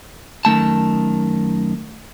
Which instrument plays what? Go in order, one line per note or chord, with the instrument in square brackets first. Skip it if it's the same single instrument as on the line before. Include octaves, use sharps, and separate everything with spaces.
[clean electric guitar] F#2 D#3 A3 A5